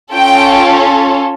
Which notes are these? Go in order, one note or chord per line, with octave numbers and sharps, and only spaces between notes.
C#4 F4 A4 G5